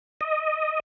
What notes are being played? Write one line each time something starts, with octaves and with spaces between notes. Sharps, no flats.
D#5